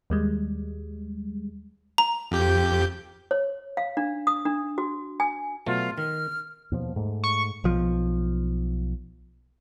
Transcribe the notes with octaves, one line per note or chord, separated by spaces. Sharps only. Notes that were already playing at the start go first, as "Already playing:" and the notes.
D#2 G3 G#3
A#5
F2 G4 G6
C#5
F5
D4
D#6
D4
F#4
G#5
B2 F#3 A3 F4
D#3 F6
D#2 B2 F3
G#2 A3
C#6
B1 F3